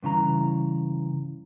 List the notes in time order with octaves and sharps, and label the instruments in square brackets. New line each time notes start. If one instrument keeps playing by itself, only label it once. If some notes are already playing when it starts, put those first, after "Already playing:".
[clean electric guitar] G2 C#3 E3 A#5